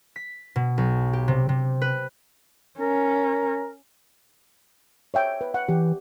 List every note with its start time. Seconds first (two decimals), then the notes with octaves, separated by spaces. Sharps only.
0.16 B6
0.56 B2
0.78 B1
1.13 G4
1.28 C3
1.49 C3
1.82 B4
2.79 C#4 A#4
5.14 C#5 E5 G5
5.41 B4
5.54 F#5
5.68 E3 G4